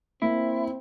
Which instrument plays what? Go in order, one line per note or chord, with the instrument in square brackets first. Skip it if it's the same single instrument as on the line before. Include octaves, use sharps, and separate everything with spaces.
[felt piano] A#3 [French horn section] C4 [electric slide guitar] E4